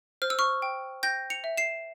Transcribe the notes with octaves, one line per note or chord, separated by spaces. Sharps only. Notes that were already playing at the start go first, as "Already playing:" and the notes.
C5 F6
E6
C#6 F6
G5
G5 G6 A#6
C#7 F7
E5
C7 E7